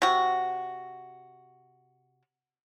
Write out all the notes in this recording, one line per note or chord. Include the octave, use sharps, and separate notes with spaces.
C3 F#4